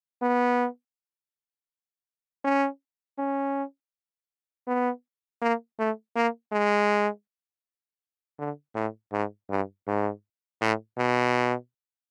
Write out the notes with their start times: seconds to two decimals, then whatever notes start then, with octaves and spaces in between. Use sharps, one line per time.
0.22 B3
2.44 C#4
3.18 C#4
4.67 B3
5.42 A#3
5.79 A3
6.16 A#3
6.52 G#3
8.39 D3
8.75 A2
9.12 G#2
9.50 G2
9.87 G#2
10.61 A2
10.98 B2